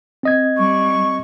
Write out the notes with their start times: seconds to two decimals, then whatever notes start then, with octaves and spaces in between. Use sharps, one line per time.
0.23 C4 D#5 G#6
0.58 G3 C#6